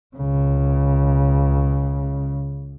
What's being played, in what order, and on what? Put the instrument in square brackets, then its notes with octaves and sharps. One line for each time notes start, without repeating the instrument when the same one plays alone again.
[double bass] C#2 C#3